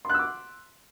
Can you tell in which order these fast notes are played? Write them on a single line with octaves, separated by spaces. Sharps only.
C6 F#6 E6 D6